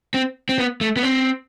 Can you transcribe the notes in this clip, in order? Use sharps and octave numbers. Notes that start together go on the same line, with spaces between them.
C4
C4
B3
A3
B3
C4